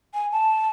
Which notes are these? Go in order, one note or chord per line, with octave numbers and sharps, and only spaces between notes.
G#5
A5